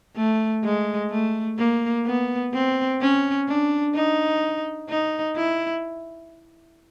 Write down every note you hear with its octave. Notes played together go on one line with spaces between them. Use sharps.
A3
G#3
A3
A#3
B3
C4
C#4
D4
D#4
D#4
E4